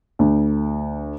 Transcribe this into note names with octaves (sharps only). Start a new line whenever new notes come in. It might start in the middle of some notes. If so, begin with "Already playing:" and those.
D2